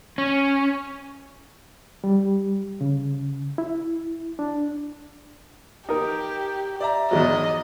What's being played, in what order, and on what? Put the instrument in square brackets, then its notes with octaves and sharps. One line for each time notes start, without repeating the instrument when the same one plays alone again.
[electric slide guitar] C#4
[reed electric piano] G3
C#3
E4
D4
[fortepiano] D#4 A#4 [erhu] G4
[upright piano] D5 E5 A#5
[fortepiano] E2 G#2 F#3 [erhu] D#5